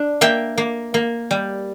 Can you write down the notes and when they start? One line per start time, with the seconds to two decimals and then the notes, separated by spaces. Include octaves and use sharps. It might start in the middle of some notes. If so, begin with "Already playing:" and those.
Already playing: D4
0.21 A#3 E5 G5
0.58 A#3
0.94 A#3
1.31 G3